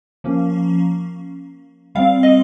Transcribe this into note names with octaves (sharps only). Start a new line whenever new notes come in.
F3 A#3 C#4
G3 C4 F5
D#5